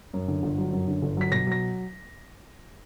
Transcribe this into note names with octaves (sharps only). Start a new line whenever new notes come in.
F#2
D3
G1
F#3
F#2
D3
G1
F#3 B6
B2 A#6
F#3 A#6